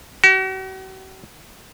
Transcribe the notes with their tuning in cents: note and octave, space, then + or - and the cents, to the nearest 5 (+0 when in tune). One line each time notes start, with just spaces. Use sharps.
F#4 +45